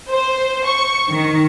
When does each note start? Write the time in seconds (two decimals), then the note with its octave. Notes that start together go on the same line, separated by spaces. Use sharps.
0.10 C5
0.66 C#6
1.10 D#3